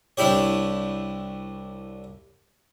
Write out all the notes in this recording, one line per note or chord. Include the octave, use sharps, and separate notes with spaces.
C2 D4 E4 G4 C#5